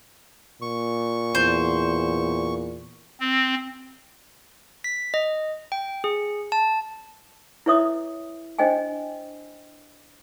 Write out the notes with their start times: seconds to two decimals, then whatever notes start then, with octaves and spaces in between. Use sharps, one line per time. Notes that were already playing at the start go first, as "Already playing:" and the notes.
0.62 A#2 C#6
1.35 E2 C5
3.20 C4
4.84 B6
5.14 D#5
5.72 G5
6.04 G#4
6.52 A5
7.66 E4 B4 C#5 E5 D#6
8.58 D4 C5 D#5 G5 G#5